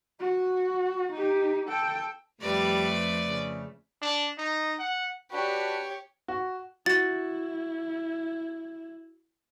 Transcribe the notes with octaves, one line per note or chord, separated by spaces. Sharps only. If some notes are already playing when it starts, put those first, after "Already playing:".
F#4
D#4 G4
A4 G5
F2 G3 A3 B4 D5
C#3
D4
D#4
F#5
D4 F#4 G4 B4 C#5
F#4
E4 F#4 A6